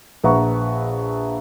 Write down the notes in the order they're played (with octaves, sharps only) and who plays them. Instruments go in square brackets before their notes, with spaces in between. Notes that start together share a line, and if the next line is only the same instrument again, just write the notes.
[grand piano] A#1 B4 E5 F#5 A#5 C#6